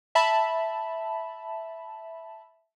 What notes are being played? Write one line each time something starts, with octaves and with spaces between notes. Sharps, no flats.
E5 A5 B5